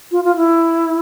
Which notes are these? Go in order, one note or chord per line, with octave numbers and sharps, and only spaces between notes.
F4
F4
E4